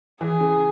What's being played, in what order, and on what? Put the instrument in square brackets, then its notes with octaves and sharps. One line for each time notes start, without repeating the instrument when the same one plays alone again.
[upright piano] E3 [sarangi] G#4
[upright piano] C#3